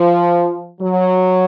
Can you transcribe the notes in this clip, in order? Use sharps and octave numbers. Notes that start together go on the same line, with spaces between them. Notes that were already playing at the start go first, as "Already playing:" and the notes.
Already playing: F3
F#3